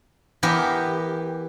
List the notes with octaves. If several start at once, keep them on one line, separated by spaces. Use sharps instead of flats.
E3 B3 G4 A#4